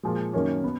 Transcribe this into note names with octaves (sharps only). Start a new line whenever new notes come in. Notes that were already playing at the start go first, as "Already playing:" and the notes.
A#2 F3 G#3
F#2 D#3 A#3 C#4
B3